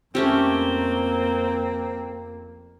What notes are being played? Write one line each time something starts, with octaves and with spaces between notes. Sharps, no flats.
F2 A3 A#3 C4 C#4 G4